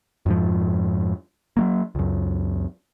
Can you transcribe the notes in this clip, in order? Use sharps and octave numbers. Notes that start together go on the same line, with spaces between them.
F2 G#2 F3
F#3 G#3 A#3
C#2 F#2